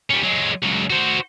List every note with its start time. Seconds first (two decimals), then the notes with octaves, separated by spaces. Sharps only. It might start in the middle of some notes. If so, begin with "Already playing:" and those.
0.10 G3 C#4
0.23 F#3 G#3
0.63 C#2 F#3
0.90 F#4 C5